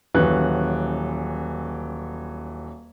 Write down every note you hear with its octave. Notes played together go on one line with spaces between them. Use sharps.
D#1 E3 F#3 C#4 F#6